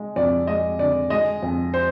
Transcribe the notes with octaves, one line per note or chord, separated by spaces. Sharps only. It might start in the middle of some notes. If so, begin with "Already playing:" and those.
Already playing: G#3
F2 D5
G#3 D#5
D3 D5
G#3 D#5
F2
C5